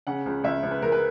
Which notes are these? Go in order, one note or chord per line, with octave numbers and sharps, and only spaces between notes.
C#3 F#5
C#2
C#2 E5
C#2
B4
C#2 A#4
B4